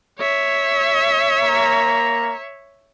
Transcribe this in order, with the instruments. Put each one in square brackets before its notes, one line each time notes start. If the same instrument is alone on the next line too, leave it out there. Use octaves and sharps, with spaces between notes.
[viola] C#5 E5
[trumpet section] A#3 A#5